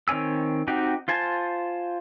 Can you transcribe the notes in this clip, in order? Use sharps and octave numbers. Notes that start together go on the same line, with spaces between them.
D#3 C4 C#5 G#5 E6
C4 D#4 F#4 G4
F4 C5 G#5 A5